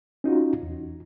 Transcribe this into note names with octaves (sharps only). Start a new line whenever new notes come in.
C#4 D#4 F4 F#4
E2